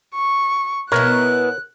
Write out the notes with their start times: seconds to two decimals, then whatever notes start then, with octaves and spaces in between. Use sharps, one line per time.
0.15 C#6
0.92 B2 B3 E4 A#4 C#5 F#6